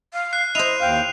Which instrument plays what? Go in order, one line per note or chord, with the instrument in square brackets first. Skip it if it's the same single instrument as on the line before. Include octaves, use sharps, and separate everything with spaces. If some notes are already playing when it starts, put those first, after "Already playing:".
[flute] F5
[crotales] F#6 C7
[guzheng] E4 C5 [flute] D#5 [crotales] D#7 F7
[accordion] D#2 F5 [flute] G5